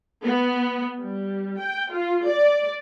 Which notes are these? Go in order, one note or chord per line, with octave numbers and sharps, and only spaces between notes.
B3
G3
G5
F4
D5